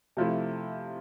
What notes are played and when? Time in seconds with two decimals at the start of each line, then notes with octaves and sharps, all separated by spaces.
0.17 C3 F3 A3 E4